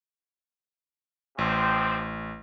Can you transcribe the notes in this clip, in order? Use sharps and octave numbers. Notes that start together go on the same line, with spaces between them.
A1 C3 F3 C4